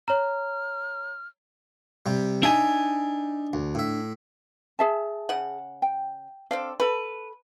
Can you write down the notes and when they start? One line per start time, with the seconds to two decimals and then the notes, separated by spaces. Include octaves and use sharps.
0.08 C#5 A#5 F6
2.06 C3 G3
2.43 D4 D#4 E5 G#5
3.53 D2
3.75 A2 E5
4.79 G#4 E5 A5
5.29 C#3 F#5
5.82 G5
6.51 C4 D4 A4 F5
6.80 A4 B4 B5